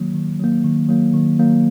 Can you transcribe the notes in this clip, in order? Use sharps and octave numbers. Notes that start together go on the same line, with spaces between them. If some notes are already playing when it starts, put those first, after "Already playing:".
Already playing: D#3 F#3 A#3
D#3
F#3 A#3
D#3
F#3 A#3
D#3
F#3 A#3